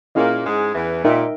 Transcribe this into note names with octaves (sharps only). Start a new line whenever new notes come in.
A#2 A#3 C#4 E4 G#4 D#5
G#2 G#3
E2 E3
A#2 D#4 A#4 E5 G5